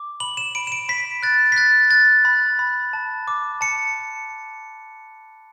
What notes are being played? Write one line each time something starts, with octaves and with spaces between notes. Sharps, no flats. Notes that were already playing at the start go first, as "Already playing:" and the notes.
Already playing: D6
B5 F#7
E7
B5 D7
E7
D7
B5 B6
F#6 A6
B6
F#6 A6
F#6 A6
B5
B5
A5
D6
A5 C#7